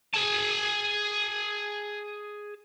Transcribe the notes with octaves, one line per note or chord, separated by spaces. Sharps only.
G#4 A5